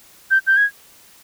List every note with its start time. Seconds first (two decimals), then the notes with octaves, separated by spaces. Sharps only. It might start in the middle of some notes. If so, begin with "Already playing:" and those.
0.31 G6
0.47 G6
0.57 G#6